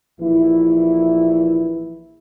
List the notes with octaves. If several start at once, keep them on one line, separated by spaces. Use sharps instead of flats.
A#1 E3 E4